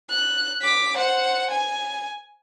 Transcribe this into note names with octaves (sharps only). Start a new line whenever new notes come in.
F#6
D6 B6
C5 F#5
G#5